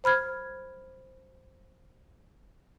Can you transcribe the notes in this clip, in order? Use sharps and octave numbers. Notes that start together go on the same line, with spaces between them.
C5 B5 F6 G#6